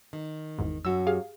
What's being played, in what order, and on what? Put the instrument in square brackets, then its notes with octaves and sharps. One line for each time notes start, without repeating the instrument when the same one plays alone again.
[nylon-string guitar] D#3
[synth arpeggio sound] G#1 E2 G#2
[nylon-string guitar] F#2 F#4 [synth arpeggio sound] E6
[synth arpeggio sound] G4 G#4 F5